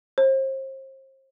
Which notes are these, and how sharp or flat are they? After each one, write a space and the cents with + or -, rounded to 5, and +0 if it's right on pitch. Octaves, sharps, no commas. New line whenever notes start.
C5 +35